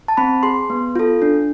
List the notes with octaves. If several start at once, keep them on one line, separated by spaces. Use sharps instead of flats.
A5
C4 B5
G#4 C6
B3
F4 A4
D4